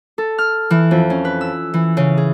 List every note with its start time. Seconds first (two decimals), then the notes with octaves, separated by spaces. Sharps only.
0.18 A4
0.38 F6
0.70 E3
0.91 F2
1.10 C#4
1.25 B4
1.41 E6
1.74 E3
1.97 C#3
2.17 G#4